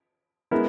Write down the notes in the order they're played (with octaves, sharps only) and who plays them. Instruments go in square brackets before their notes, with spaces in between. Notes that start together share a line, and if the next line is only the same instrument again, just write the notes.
[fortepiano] G#3 B3 E4 A#4